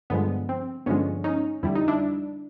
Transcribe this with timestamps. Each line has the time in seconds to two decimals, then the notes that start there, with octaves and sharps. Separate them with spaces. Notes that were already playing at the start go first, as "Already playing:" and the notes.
0.10 G2 D3 F3 G#3 B3
0.49 C4
0.86 G2 D3 F3 G#3 B3 C#4
1.24 C#4 D#4
1.63 F2 D3 G3 E4
1.75 D#4
1.88 D4 E4